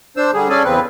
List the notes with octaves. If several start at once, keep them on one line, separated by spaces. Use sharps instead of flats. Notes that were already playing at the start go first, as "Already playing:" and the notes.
D4 C5 E6
D3 G3 G#4
C#4 G#4 A4 D5 G#5
E2 C#3 C4 B4